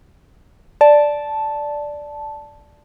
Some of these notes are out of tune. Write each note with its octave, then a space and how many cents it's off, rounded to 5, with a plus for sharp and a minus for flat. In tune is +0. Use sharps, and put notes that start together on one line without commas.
D5 +0 A5 -5